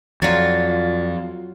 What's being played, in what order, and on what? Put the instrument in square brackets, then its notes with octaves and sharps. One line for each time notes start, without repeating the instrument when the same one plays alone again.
[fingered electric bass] F2 [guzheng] F#3 F4 [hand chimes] D5 A6